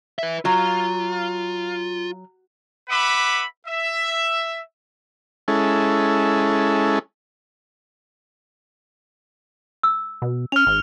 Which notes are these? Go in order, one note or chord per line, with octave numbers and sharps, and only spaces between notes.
B4 E5
F#3 F4
B4 E5 F#5 B5 D6
E5
G#3 C#4 E4 A4
E6
B2
C#4 F6 F7
G#1